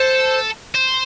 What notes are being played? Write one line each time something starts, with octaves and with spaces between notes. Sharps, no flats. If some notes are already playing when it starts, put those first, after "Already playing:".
Already playing: A4 C5
C5